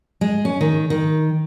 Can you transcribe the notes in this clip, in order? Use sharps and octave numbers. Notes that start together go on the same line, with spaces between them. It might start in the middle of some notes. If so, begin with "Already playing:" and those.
G#3
C#4
D#3
D#3